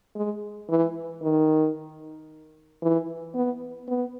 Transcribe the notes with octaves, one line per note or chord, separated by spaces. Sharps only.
G#3
E3
D#3
E3
B3
B3